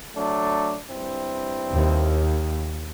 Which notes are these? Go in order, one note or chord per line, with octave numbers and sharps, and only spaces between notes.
F#3 A3 D4
G2 C4 E4
D#2